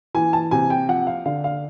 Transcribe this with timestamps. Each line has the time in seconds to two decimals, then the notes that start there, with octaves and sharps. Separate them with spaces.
0.15 E3 G#5
0.33 A5
0.51 C3 G#5
0.70 G5
0.89 F3 F#5
1.07 F5
1.26 D3 F5
1.44 F5